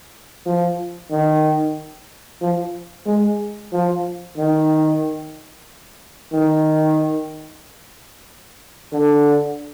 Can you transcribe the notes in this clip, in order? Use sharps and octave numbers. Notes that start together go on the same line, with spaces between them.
F3
D#3
F3
G#3
F3
D#3
D#3
D3